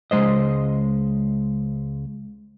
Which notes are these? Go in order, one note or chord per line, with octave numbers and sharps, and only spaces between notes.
C#2 C#3 G#3 C5 D#5